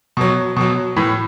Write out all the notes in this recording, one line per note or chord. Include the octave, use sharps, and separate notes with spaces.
B2 F#3
B2 F#3
A2 E3